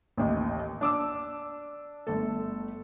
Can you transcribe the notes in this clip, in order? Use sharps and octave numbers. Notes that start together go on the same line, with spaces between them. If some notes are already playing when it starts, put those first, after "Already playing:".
A1 D#2 D#5
D4 D6 E6
G1 A3 A4